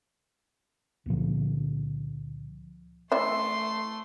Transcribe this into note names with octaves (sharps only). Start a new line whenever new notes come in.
C#2 A#2 D3 F3
E3 A3 D5 E5 C6